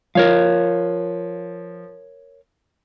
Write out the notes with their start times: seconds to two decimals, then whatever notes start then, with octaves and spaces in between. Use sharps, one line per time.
0.15 F3 A#4 C#5 F5